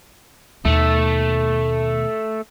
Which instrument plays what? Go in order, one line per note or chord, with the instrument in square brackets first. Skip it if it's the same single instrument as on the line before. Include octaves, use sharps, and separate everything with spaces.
[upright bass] D#2 B2 [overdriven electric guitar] A3